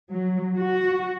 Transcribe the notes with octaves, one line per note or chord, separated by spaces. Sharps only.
F#3
F#4